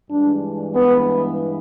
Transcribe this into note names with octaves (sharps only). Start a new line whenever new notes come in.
G2 E3 G#3 D4
B3